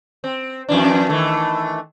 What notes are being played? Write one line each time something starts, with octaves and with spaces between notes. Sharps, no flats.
C4
F2 E3 D4
D#3 E3 A3